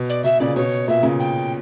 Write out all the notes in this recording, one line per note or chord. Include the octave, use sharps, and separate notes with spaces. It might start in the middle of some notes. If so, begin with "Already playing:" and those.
Already playing: B2
D5
B2 E5
A#2 C#3 D5
B2 C#5
A#2 E5
A#2 C#3
G5